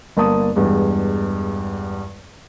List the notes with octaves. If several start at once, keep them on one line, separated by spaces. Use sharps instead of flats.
G1 A#3 A5 D#6
E2 G2 G#3